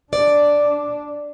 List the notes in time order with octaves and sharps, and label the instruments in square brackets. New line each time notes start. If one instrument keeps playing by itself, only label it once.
[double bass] D4 [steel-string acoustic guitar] D5